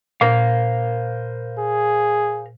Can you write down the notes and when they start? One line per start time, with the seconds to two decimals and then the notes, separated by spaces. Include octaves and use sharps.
0.21 A#2 A#4 C5 F5
1.58 G#4